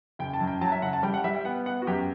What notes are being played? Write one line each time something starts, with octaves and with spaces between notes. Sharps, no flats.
F#1 G5
A5
F#2
G5
F#3 A5
E5
F#1 F#5
A5
G3 G5
F#5
G3 E5
G5
B3 F#5
B3 F#5
F#4
F#2 G4